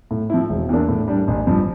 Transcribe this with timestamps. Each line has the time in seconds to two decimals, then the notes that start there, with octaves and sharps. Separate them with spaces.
0.11 A2
0.30 F3 C4 E4
0.50 E1
0.69 E2 E3 A#3 D4
0.89 A2
1.08 G3 D4
1.28 A1
1.47 G2 F3